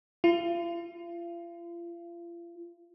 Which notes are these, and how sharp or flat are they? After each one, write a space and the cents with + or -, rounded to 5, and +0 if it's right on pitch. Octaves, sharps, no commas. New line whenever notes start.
F4 -40